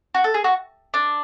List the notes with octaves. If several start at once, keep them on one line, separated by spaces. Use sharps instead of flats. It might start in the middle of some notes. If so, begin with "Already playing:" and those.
F#4
A4
G#4
F#4
D4